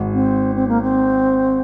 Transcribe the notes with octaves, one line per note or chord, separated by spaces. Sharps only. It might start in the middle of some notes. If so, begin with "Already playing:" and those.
Already playing: G#1 G#2
C4
C4
A#3
C4